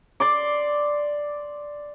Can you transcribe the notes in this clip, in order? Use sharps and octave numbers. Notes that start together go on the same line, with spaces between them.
D5 C6 D6